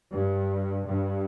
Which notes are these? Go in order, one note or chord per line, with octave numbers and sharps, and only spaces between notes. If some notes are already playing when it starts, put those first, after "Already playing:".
G2
G2